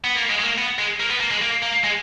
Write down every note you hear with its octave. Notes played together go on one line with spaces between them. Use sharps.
B3
A#3
G#3
G#3
A#3
B3
G#3
A#3
B3
A#3
G#3
A#3
A#3
G#3